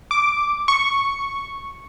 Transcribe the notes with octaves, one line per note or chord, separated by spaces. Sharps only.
D6
C#6